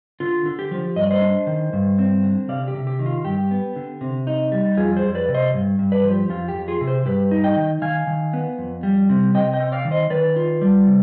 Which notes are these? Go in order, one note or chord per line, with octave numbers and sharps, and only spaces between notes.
D3 F4
D3
G4
F3
G2 D#5
D5
C5 D#5
D4
D#3
G2
C4
D3
C3 D5 F5
G4
C3
G4
D#3
F4
G2 G4
B3
D3
C3
D#4
G3
F2 F4 G#4
G#4 C5
F2
B4 D5
C3
C5 D#5
G2
G2
B4 D5
F3
G4
F2 F4
G4
F2
F4 G#4
C3
G#4 C5
G2 G4 B4
D#4
D#5 G5
D#3
D#3 F5 G#5
D#3
B3
F2
G3
C3
C3 D#5 G5
D#5 G5
C4
D5 F5
D#3
C5 D#5
D#3 B4 D5
F4
G3
C3